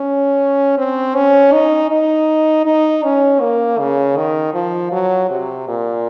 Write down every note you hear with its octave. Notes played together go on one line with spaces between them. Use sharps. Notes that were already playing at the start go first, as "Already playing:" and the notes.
Already playing: C#4
C4
C#4
D#4
D#4
D#4
C#4
A#3
C#3
D#3
F3
F#3
C3
A#2